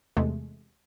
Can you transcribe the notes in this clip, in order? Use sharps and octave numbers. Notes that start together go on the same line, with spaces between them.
E2 C3 G#3 A3